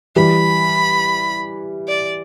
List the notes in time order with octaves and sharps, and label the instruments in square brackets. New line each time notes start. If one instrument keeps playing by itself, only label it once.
[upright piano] E3 G3 [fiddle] B5
[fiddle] D5